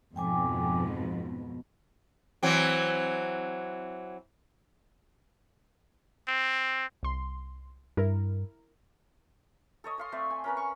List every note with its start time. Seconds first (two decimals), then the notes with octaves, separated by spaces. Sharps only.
0.16 F2 G#2 B2 G5 G#5 D6
0.88 B3
2.43 E3 F#3 C4
6.28 C4
7.03 C2 C6
7.97 G2 E4 A#4
9.84 A4 C#5 D#5
9.98 C#5 F5 C6
10.12 A3 C4 D5 E5
10.30 G#5
10.44 C#4 A#4 B4
10.57 C#6